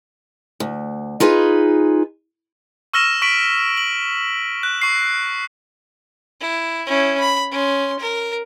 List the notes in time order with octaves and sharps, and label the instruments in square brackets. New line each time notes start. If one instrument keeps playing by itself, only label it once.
[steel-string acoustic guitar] D2
D#4 F4 G#4 B4
[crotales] C#6 E6 F6 A#6 D#7 E7
C#6 B6 D7 F#7
F#7
F#6
C#6 C7
[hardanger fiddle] E4
C#4 E4
B5
C#4 C6
A#4